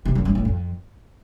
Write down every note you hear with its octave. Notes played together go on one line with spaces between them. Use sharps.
C3
F#2
G2
A2
F2